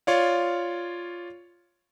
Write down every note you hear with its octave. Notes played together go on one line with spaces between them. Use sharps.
F4 C#5 D5 F5